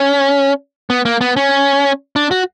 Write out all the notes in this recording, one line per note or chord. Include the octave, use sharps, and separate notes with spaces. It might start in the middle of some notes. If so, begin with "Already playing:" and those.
Already playing: C#4
B3
A#3
B3
C#4
D4
F#4